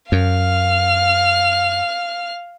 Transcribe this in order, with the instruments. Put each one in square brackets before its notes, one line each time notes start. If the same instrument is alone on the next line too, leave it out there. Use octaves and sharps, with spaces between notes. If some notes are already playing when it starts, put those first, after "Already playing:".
[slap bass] F#2 [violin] F5 F6